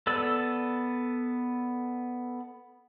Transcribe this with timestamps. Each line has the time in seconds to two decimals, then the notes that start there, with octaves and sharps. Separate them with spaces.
0.07 B3 A4 D5 E6